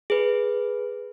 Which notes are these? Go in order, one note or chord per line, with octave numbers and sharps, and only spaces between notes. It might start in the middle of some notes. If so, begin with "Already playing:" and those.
G#4 B4